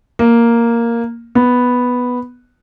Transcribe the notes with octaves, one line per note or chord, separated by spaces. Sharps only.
A#3
B3